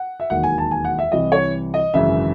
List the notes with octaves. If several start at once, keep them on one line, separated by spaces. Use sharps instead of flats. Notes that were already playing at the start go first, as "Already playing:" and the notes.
Already playing: F#5
E5
E1 D#2 D#3 F#3 F#5
G#5
A5
G#5
F#5
E5
C2 C3 E3 D#5
C#5
D#5
G#1 F#2 C#3 E3 E5